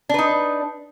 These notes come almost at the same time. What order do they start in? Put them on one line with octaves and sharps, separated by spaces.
D4 B4 D#4